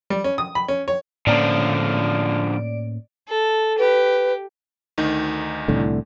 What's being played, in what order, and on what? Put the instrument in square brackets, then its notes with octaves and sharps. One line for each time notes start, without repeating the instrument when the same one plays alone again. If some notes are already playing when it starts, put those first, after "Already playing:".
[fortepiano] G3
C#4
D#6
B5
C#4
C#5
[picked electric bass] A2 A#3 C#4 [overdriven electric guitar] D3 F3 [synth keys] D5 D7
[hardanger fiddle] A4
[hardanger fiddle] G4 [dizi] B4
[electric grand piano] D2 D#3 D#4
[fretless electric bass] C2 A2 D3